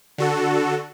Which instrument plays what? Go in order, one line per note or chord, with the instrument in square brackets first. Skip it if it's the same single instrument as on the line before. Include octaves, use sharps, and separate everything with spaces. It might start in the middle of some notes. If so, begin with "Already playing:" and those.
[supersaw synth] D3 F#4 A4